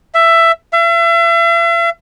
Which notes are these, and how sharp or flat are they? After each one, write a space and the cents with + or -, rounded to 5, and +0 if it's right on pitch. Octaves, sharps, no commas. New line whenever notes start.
E5 +15
E5 +40